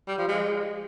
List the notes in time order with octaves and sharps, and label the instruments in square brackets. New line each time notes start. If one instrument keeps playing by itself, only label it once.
[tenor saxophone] G3
F3
G#3